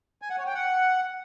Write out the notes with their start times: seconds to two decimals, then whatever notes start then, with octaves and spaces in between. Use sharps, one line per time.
0.22 G#5
0.30 F#5
0.38 C#5
0.46 G5
0.54 F#5